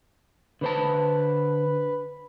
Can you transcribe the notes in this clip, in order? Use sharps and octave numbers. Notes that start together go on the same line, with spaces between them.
D3 B4 C5 A5